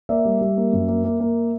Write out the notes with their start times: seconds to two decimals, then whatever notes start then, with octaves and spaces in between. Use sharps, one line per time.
0.09 A#3 D5 E5
0.25 G3
0.41 G3
0.57 A#3
0.73 F#2
0.88 A#3
1.04 A#3
1.20 A#3